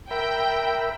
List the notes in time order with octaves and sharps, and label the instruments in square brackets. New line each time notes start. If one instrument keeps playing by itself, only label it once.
[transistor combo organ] A#4 E5 B5 [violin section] G5